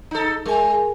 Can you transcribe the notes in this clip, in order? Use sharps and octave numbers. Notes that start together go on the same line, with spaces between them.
D#4 A4
G#3 A#4 G#5